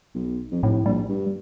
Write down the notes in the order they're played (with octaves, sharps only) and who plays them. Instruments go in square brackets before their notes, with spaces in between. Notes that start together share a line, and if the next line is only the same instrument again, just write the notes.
[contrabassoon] B1
F2
[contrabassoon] F1 [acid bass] A2
[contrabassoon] A#1 [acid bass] G3
[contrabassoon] G2